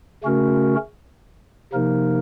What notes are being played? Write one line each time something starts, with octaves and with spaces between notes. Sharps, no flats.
C#3 A3 C#4 F#4 A#4
C3 F3 A#3 D#4 A#4